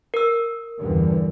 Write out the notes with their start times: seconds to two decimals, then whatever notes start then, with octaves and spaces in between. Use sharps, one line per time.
0.14 A#4 E6
0.79 E2 G2 D3